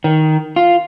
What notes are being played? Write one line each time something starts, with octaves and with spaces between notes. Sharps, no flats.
D#3
F4